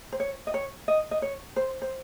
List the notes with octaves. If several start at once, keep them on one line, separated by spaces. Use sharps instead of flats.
C5
C#5
D#5
C#5
D#5
D#5
C#5
C5
C5